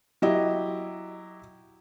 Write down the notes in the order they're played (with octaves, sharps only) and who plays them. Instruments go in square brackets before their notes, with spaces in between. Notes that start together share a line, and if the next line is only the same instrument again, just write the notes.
[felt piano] F#3 E4 G4 D#5